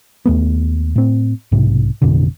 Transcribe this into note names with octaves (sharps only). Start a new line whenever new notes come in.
D#2 A3 B3
A2 C4
B1 G#2 C3
A1 F2 B2 D3